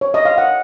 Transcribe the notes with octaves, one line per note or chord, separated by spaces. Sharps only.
C#5
D#5
F5
F#5